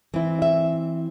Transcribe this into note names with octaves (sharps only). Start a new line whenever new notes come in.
E3 C4 E4
E5